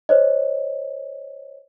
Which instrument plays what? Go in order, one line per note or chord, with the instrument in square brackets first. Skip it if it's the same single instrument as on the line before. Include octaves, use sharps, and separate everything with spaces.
[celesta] C5 C#5 D#5